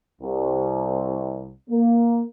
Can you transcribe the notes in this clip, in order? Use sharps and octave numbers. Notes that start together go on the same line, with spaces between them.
C2
A#3